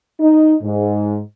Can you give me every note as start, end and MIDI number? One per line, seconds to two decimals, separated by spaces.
0.21 0.54 63
0.62 1.19 44